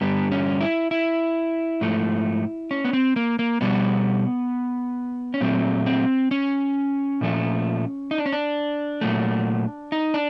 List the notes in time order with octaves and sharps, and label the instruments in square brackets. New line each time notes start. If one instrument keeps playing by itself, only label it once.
[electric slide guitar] G2 D3 G3 B3
C#4
E4
E4
G#2 F3 A3
C#4
B3
C4
A#3
A#3
B2 G3 B3
C#4
A#2 F#3 A3 C4
C4
C#4
A#2 F3 A3
D#4
D4
C#4
D4
A#2 F#3 A3
D#4
D4